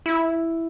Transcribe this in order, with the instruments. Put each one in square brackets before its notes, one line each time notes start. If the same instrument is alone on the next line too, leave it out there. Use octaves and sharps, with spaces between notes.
[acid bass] E4